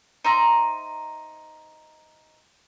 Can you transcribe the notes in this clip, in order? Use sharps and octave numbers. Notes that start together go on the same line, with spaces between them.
D#4 C5 E5 A#5